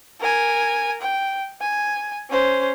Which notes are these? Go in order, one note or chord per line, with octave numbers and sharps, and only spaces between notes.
A#4 G#5
G5
G#5
C#4 C5